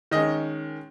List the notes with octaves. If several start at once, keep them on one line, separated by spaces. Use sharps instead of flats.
D#3 G#3 C#4 D#5